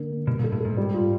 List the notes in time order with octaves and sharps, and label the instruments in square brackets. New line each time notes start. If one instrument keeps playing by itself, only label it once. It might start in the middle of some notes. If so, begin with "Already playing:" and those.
Already playing: [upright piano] D3 A#3
A#3
[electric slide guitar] B2 [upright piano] G3
[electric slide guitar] A#2
[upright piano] A4
[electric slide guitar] A2
[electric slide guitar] G#2 [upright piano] A4
[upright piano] G3
F4